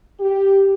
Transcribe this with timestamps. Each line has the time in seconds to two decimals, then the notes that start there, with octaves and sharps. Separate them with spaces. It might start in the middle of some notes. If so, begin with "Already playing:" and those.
0.20 G4